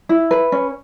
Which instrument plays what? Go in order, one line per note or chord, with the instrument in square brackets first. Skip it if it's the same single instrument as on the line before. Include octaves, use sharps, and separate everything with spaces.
[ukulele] E4
B4
C#4